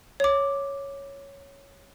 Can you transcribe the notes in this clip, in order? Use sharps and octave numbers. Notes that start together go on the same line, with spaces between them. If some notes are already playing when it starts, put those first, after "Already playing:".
C#5 D6